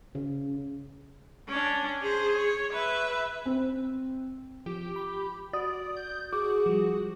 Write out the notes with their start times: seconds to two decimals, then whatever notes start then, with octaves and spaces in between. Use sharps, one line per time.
0.15 C#3
1.48 C#4 D4
2.01 G#4 C5
2.35 C#5
2.73 B4 E5
3.46 C4
4.66 F3 G4
4.96 B5
5.53 F#4 D5 D#6
5.97 G6
6.32 F#4 G#4 D6
6.66 F3 G3